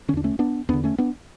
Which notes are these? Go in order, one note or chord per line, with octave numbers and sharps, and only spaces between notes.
D3 C#4
E2 D4
A3 C#4
B3 D4
E2 D3 B3 D4
A3 C#4
B3 D4